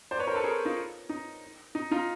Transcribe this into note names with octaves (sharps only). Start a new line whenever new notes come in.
C5 D5
B4 C#5
A#4 C5
A4 B4
G#4 A#4
D#4 F4
D#4
D#4
D#4 F4